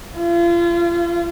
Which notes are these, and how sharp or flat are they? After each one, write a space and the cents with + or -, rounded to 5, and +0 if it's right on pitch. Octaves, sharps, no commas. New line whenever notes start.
F4 -35